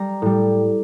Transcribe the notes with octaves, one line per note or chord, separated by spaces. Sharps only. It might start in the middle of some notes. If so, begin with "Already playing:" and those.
Already playing: G3 A#5
A2 G3